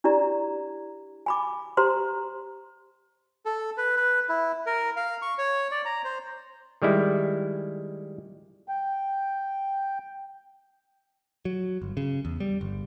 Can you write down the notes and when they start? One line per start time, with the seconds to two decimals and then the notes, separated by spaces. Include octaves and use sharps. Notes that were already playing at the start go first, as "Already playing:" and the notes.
0.04 D4 E4 G4 D5 A#5
1.26 G#5 B5 D6
1.77 G4 C5 A#5 C6
3.46 A4
3.77 B4
3.97 B4
4.29 E4
4.66 A#4
4.96 F5
5.22 C#6
5.38 C#5
5.71 D5
5.85 A#5
6.04 C5
6.82 D#3 G3 G#3 E4
8.68 G5
11.45 F#3
11.82 G1
11.97 C#3
12.25 E2
12.40 G3
12.61 G1